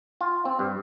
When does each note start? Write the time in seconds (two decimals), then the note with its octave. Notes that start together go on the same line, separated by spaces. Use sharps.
0.21 F4
0.45 C4
0.59 G2